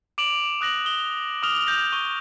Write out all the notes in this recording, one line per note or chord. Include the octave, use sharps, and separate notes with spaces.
D6 D7 F7 F#7
D#6 F#6 A#6 F#7
D#6 G7
D6 D#6 F6 F7 G7
F6 G6 A#6
C#6 G7